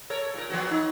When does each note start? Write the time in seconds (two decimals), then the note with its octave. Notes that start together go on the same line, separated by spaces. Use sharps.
0.10 A4 A#4 C#5
0.34 A#2 A#4
0.50 F3 B3 F#4
0.71 D#4